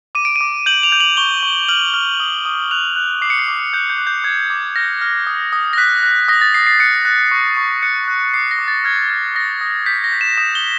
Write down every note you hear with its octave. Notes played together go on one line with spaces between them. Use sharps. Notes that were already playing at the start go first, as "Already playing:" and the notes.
D6 D#7
D7
D6 D#7
G6 F#7
F7
G6
F#7
C#6 G7
C#6
F6 F#7
F6
D#6
D#6
F#6 F7
F#6
D6 C7
C#7
C7
D6
F#6 G6
G6
F#6
G6
D6 G#6
D6
F6 A#6
F6
D#6
D#6
A#6
F#6 B6
F#6
D#6 A#6
A6
D#6 C7
C7
F#6 C#7
F#6
C#6
C#6
F#6 C#7
F#6
D6 C7
A#6
D6
A6
F6 G#6
F6
D#6 A#6
D#6
G6 B6
A#6
G6
E7
D#6 E7
G7